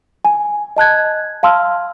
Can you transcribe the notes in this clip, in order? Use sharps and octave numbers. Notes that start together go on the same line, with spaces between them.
G#5
D#5 A5 F#6 G#6
F5 A5 C6 E6 F6